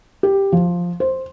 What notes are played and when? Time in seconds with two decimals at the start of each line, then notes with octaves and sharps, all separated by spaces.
0.23 G4
0.52 F3
1.00 C5